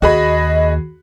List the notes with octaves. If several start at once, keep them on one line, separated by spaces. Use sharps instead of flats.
D#2 F#4 G#4 D#5 B5